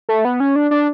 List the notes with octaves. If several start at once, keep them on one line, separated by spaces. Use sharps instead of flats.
A3
B3
C#4
D4
D4